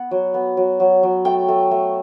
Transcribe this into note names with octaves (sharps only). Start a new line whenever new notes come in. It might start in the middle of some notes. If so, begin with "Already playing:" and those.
Already playing: B3 F#5
F#3
B3
F#3
F#3
F#3
A3 G5
A3
A3